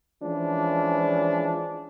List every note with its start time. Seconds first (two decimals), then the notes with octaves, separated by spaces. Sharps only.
0.23 E3 F3 G#3 C#4 D4